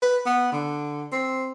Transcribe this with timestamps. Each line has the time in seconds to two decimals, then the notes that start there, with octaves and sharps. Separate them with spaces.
0.02 B4
0.26 B3
0.52 D3
1.12 C4